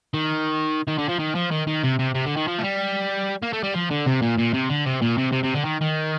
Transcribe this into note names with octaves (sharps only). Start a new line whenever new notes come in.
D#3
D#3
D3
F3
D#3
F3
D#3
D#3
C3
C3
C3
D3
D#3
F3
A3
G3
A#3
A3
G3
F3
D3
C3
A#2
A#2
C3
D3
C3
A#2
C3
C3
C3
D3
D#3
D#3